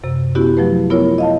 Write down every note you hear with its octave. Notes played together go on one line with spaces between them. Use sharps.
F#2 C3
B3 C#4 E4 F#4 G4
F3 F#3 A3 B4
B3 E4 F4 A#4 C#5
D#5 F5 A5